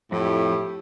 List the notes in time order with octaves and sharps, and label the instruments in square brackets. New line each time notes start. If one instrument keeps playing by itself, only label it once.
[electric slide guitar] F2 [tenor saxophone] A2 [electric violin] E4 G4